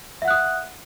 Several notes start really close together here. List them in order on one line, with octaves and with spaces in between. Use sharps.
E5 F#5 F#6 D#6